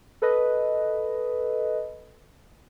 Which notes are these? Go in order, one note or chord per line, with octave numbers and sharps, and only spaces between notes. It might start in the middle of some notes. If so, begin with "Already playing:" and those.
A4 B4 D#5